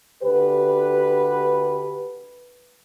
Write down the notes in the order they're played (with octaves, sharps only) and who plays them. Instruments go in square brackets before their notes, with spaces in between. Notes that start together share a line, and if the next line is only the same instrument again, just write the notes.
[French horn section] D2 D3 G4 B4